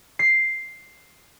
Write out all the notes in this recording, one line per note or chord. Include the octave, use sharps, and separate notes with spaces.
C7